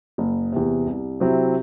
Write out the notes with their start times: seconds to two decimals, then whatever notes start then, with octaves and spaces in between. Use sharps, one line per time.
0.18 F#1
0.52 E2 C3
0.86 C2
1.20 C3 F#3 C4 E4